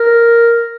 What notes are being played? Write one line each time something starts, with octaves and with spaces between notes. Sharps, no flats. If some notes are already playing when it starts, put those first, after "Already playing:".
Already playing: A#4